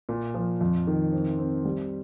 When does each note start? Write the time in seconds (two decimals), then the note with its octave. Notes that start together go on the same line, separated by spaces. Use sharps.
0.09 A#2
0.34 F3
0.61 F2
0.87 D#3
1.12 C4
1.39 C4
1.65 G3